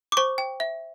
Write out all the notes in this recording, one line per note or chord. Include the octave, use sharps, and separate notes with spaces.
D6
C5 C#6
G5
E5